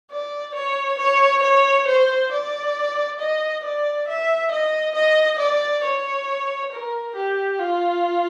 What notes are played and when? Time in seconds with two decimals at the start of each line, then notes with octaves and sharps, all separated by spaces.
0.11 D5
0.55 C#5
0.99 C#5
1.43 C#5
1.87 C5
2.32 D5
3.20 D#5
3.64 D5
4.08 E5
4.52 D#5
4.95 D#5
5.39 D5
5.84 C#5
6.72 A#4
7.16 G4
7.59 F4